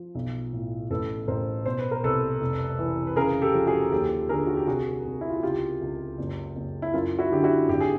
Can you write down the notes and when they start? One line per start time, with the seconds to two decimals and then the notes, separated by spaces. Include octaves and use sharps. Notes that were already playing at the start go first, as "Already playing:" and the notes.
Already playing: F3
0.15 B1
0.53 A2
0.90 A1 A4 B4
1.28 A1 A#4 C5
1.65 B2 C5
1.79 B4
1.91 A#4
2.03 C2 A4 B4
2.41 F1
2.79 E3
3.07 B4
3.16 C#3 G#4 A#4
3.42 G4 A4
3.54 F3
3.67 F#4 G#4
3.92 D#2 G4 A4
4.29 D3 G#4 A#4
4.47 F#4
4.57 G4
4.67 C2 F#4 G#4
5.05 C2
5.21 E4
5.29 F4
5.36 F#4
5.43 C#2 F4 G4
5.81 C#2
6.18 F#1
6.56 F#1
6.82 E4
6.94 F#2 F4
7.19 E4 F#4
7.32 D3 G4
7.44 E4 F#4
7.69 G#1 G4
7.80 G#4